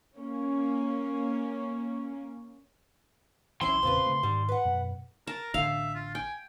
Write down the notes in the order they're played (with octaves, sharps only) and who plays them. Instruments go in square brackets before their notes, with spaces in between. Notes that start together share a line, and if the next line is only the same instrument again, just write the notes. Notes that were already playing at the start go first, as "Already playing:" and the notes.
[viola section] A#3 C#4
[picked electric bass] B1 E3 [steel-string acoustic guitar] C#4 E4 [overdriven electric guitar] C6
[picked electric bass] E1 A#2 C#3 [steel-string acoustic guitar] C4 F4 B4
[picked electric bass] C#3 A3
[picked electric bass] G#2 D#3 [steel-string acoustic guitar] G3
[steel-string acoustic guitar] B4 F#5
[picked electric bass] F#2 B2
[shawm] A#4 [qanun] A5
[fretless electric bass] A1 D3 [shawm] E5 [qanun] F5
[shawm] F4
[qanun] G5 [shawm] G#5